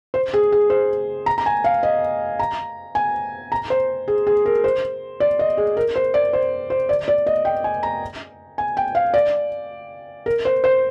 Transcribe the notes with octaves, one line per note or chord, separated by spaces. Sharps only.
C5
G#4
G#4
C5
A#5
A#5
G#5
F5
D#5
A#5
G#5
A#5
C5
G#4
G#4
A#4
C5
D5
D#5
G#4
A#4
C5
D5
C5
C5
D5
D5
D#5
G5
G#5
A#5
G#5
G5
F5
D5
A#4
C5
C5